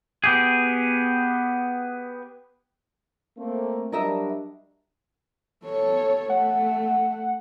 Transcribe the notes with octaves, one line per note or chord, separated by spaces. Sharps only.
B3 G4 G#4
A3 A#3 C4
F#3 G3 D4 A#4 D#5 E5
A4 C#5
A3 F#5